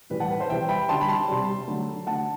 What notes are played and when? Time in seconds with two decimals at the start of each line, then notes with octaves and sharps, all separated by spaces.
0.10 A2 E3 G3 B4
0.20 F#5 A5
0.31 B4
0.40 C5
0.50 C3 E3 G3 E5 G5
0.69 G5 B5
0.89 D3 G3 A5 C6
1.01 B5
1.08 A5 C6
1.28 C3 G3
1.68 D3 F#3 A3
2.07 D3 A3 F#5 A5